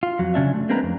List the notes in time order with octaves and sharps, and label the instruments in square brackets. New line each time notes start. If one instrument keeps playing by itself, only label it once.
[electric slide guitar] F4
F2 F#3
C#3 C#4 D4 E5
A3
G#3 A#3 C4 D4 B4 A#5
F2